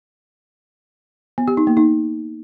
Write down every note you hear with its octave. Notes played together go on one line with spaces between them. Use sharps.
B3
G4
D#4
A#3
D#4